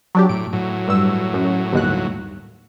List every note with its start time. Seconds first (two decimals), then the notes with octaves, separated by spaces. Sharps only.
0.15 F#3 D4 G4
0.29 A2 D7
0.53 A2 F#3
0.88 G2 E6
1.33 F#2
1.73 G1 D#2 F#6